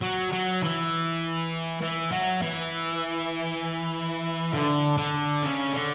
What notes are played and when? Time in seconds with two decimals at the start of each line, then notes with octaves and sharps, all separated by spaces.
0.02 F#3
0.32 F#3
0.63 E3
1.82 E3
2.12 F#3
2.42 E3
4.54 D3
4.98 D3
5.43 C#3
5.73 D3